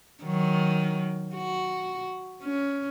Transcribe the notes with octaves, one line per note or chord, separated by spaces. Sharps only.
D#3 F#3
F#4
C#4